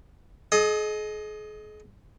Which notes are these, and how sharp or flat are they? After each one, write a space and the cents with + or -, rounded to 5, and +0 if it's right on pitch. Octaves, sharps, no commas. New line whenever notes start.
G#4 +40 D#5 +0